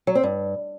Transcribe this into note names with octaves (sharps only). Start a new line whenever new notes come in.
F#3
C4
G2